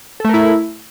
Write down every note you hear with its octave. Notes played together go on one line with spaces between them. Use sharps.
A3 E4 A4 A#4